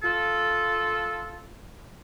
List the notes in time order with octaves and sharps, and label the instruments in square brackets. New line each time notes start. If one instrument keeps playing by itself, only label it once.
[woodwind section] F4 A4